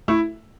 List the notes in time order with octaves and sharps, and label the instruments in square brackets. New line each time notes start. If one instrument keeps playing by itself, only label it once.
[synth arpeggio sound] A3 [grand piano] E4